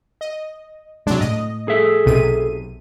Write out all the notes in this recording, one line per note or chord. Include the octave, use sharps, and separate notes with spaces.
D#5
C3 F#3 G#3 D4
A2 D#5
G#4 A4 E5
B1 C3 D#7